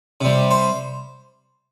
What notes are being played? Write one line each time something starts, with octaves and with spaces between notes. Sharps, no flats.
C3 G3
C5